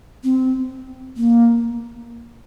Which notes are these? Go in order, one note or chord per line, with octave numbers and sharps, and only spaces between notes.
C4
A#3